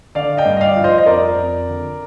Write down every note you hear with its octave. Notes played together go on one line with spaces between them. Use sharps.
D3 D5 F5
D#5 G5
G2
D#5
D5 F5
F3
C5 D#5
D#5
F2 A#4 D5
F2
D3